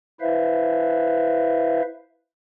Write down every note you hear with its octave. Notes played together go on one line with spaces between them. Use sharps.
E4 B4 C5 E5 F5